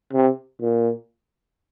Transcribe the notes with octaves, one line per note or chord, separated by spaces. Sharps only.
C3
A#2